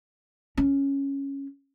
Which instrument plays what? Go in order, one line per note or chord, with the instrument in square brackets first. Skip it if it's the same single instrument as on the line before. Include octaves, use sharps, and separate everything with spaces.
[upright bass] C#4